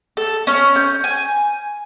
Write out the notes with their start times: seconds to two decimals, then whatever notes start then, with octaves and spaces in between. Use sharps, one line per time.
0.17 A4
0.47 C#4
0.76 G6
1.04 G#5